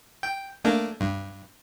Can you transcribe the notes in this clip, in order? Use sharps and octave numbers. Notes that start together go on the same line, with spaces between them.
G5
A3 A#3 D4
G2